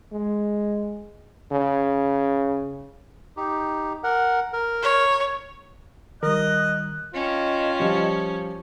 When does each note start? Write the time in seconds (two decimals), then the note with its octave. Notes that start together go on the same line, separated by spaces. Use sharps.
0.12 G#3
1.52 C#3
3.37 D#4 G4
4.04 A#4 F#5
4.53 A#4
4.83 C#5
6.23 D#3 G3 A#4 D#5 F#6
7.14 C#4 F4 D#5 G5 A5
7.80 F3 G3